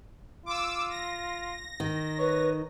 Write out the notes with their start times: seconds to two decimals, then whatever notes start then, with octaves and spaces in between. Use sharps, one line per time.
0.46 F4 D6 E6
0.90 A#6
1.80 D#3
2.18 B4 C#5